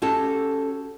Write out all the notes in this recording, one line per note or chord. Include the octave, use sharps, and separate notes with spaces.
C#4 F#4 G4 A4